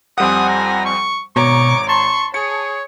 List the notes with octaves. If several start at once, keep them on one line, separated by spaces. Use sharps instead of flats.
F2 G3 C4 F#5 G#5 D#6
A#5
C#6
G#1 B2 C#5 A#5 C#6 D6
A5 C6 C#6
G#4 C#5 C#7